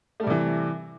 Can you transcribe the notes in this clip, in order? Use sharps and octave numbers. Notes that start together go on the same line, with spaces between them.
C3 E3 G3 A3